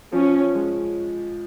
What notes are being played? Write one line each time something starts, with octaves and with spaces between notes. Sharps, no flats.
F3 C#4
G#3